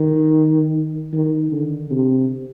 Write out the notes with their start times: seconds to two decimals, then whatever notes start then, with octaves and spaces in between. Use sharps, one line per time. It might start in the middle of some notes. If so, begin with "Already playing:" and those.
Already playing: D#3
1.13 D#3
1.52 D3
1.91 C3